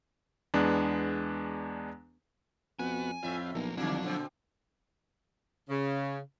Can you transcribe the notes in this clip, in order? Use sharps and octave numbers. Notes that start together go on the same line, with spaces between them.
E2 G#3 B3 D4
F2 B3 F#4 G#5
F2 A2 F4 E5
B1 A#2 F3 A#3
C2 D3 F3 F#3 G#3 A#3 D4
A#2 D3 C4
C#3